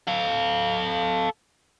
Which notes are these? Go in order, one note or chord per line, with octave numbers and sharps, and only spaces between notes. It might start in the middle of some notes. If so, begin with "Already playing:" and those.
A4 F5